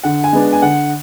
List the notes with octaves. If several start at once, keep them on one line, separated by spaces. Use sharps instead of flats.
D3 F#5
G#5
G#3 B3 D4
G#5
D3 F#5